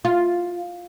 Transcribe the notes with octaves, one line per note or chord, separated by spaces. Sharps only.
F4